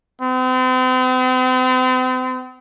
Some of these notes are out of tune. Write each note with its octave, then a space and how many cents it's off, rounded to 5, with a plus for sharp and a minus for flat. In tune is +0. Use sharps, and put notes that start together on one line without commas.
C4 -40